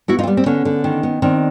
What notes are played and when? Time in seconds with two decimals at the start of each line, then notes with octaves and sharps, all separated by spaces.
0.08 B3 E4 F#4
0.19 D#4 F4
0.23 C4
0.27 G3 B3
0.37 C4
0.46 D3 B3 C#4
0.65 D3
0.84 D#3
1.03 B3
1.22 D#3 C4 D4